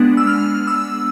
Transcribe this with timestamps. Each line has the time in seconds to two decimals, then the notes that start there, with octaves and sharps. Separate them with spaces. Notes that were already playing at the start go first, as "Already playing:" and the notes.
Already playing: G#3 B3 D4
0.17 E6
0.27 F6
0.67 E6